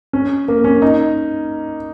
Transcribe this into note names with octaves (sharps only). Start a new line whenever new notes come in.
C#4
A#3
C#4
D#4